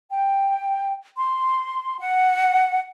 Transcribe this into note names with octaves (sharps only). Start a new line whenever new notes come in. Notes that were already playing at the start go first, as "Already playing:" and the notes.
G5
C6
F#5